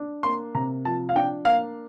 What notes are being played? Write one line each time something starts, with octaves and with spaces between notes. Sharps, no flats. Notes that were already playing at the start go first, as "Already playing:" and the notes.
Already playing: D4
A#3 C6
C3 A#5
F3 A5
F5
D4 G5
A#3 F5